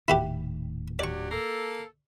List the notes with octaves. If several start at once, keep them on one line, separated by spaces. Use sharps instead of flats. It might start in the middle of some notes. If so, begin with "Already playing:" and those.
D#1 A2 D#3 E4 F#4 G4
F#3 D4 G4 D5 C#6
A#3 A4